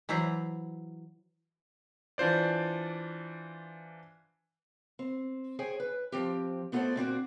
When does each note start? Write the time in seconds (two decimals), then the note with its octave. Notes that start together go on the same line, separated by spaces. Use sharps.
0.09 E3 F#3 E4 C5 A#5
2.18 E3 D4 F4 C5 D5
4.99 C4
5.59 G#4 C5 C#5 G5 G#5
5.80 B4
6.12 F3 C4 G4
6.72 A3 B3 F4 A4 C5 D5
6.96 A#2 C4 D4 F#4